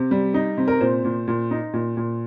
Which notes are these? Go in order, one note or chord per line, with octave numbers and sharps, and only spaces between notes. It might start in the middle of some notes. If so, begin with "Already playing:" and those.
Already playing: C3
G3
D#4
C3
A#4
A#2 C5
A#2
A#2
D#4
A#2
A#2